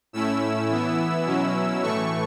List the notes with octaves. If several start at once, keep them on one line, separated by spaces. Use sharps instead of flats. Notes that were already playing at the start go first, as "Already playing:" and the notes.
A2 A3 C#4 E4 E6
E3 B3 E4
B2 F#3 C#4 E4
A2 E3 A3 C#6